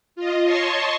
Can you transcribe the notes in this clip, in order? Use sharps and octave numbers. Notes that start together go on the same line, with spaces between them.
F4 D#5
C#5 D#5 A5 C6 C#6